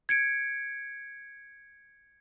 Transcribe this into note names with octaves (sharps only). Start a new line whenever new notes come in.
G#6 C#7 D7